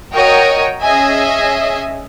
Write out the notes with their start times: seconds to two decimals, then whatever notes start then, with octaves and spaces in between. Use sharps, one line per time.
0.14 F#4 A#4 C#5 D#5 G5
0.81 C#4 G#4 D#5 E5 G#5